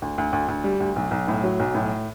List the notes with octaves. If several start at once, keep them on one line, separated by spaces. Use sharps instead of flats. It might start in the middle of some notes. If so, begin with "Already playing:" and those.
D2
D2
D2
D2
G3
D2
B1
B1
A2
F#3
B1
A2